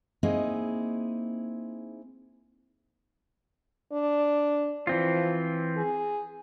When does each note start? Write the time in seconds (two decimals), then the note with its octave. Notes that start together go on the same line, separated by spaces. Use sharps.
0.23 A#3 C4 D#4 E4 G#4
3.93 D4
4.87 E3 F3 C4 F4
5.77 G#4